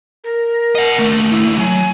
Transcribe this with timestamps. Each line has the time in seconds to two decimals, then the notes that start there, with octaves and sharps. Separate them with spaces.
0.24 A#4
0.75 D#5 F#5
0.98 D#2 A3
1.31 E4
1.58 F#3 G#5